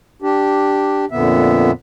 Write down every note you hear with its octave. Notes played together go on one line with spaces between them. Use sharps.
D4 G4
F2 A#2 D3 B3 E5